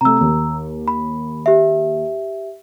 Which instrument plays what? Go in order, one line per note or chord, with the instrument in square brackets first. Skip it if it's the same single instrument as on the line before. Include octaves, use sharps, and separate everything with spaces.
[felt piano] C3 A3 [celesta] A#5 E6
[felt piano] D#2
[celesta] B5
G4 E5